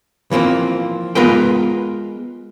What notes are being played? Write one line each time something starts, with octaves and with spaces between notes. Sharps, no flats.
E3 F3 A#3 C4
G#3 B3 F4 A#4 B4 G5